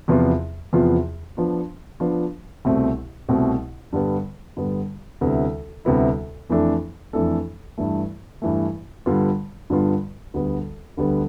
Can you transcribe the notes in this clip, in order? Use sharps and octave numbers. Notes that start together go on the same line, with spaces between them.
E2 C3 F3 B3 F4
E2 C3 F3 B3 F4
F3 B3 D4 F4
F3 B3 D4 F4
C2 B2 A3 C4
C2 B2 A3 C4
G2 D3 G3 B3
G2 D3 G3 B3
D2 C3 G3 B3 E4
D2 C3 G3 B3 E4
F2 E3 A3 D4 A4
F2 E3 A3 D4 A4
G2 E3 A3
G2 E3 A3
G2 D3 G3 B3 F4
G2 D3 G3 B3 F4
D2 D3 G3 B3
D2 D3 G3 B3